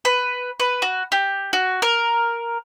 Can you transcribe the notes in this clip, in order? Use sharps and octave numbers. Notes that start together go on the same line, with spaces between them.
B4
B4
F#4
G4
F#4
A#4